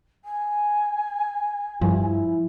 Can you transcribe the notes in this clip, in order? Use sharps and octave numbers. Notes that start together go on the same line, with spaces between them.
G#5
G2 F3 E4